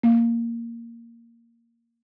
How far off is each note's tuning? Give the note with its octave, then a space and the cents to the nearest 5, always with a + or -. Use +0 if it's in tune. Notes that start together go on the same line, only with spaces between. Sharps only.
A#3 -5